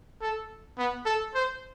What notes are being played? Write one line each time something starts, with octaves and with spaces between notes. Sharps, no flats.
A4
B3
A4
C5